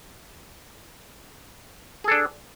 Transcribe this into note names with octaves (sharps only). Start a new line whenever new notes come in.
D4 G#4 A4